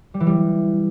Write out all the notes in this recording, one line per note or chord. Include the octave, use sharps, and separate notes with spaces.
G3
E3
G3